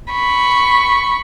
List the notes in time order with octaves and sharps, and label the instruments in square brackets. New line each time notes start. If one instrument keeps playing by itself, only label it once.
[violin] B5 C#6